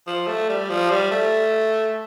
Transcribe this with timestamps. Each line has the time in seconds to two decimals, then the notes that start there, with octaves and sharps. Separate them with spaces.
0.07 F3
0.27 A3
0.49 G3
0.69 F3
0.91 G3
1.11 A3